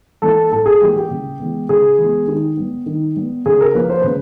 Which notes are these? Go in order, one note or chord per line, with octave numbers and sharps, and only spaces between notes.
E3 G3 A#3 A4
A2 A4
G#4
E3 G3 A#3 G4
G4
C#3
E3 G#3 B3
C#3 G#4
E3 G#3 B3
D#3 G4
G3 B3
D#3
G3 B3
C#3 G#4
A#4
F3 A#3 B4
C5
C#3 B4